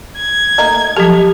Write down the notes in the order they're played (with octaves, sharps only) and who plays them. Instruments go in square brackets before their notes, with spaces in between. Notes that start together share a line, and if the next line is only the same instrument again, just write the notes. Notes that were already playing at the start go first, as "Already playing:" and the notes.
[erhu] G#6
[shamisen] A3 A#3 D#4
[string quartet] F3 [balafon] F#3 G4 [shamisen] A4